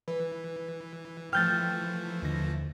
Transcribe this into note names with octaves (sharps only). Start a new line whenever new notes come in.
E3 B4
E3 F3 A3 G5 F6 G6 A6
D#2 D3 A#6